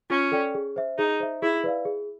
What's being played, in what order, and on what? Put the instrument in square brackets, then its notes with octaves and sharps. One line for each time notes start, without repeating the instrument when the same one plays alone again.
[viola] C#4 [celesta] F4
[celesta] A4 D5 G5
G#4
C5 E5
[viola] D#4 [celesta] G#4
[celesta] C5 E5
[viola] E4 [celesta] G#4
[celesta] B4 D5 F5
G#4